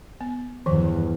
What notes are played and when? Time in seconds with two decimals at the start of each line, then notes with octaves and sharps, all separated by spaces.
0.21 B3
0.66 E2 G2 D#3 F3